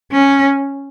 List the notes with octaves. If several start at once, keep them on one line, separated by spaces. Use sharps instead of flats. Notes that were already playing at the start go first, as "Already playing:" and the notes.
C#4